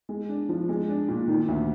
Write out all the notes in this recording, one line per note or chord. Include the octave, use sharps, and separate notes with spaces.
G#3
D4
F3
G#3
D4
A#2
D#3
D2